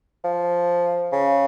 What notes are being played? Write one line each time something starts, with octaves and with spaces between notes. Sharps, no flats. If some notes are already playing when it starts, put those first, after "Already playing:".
F3
C#3